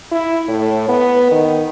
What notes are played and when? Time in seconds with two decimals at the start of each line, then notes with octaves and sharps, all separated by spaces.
0.11 E4
0.48 A2
0.88 B3
1.31 D#3